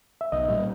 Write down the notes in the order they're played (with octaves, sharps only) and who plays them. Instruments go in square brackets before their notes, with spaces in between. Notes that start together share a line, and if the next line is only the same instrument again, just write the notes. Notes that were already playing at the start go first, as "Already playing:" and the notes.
[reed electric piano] E5
[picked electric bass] B1 [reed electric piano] D#5
[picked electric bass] A#2 G3